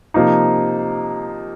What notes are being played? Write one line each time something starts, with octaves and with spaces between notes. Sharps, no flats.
C3 F3 A#3 D#4